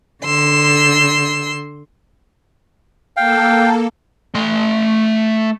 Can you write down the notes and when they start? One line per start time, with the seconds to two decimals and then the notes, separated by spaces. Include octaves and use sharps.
0.24 D3 C6 E6
3.17 A#3 A4 F5 G5
4.35 A3 C6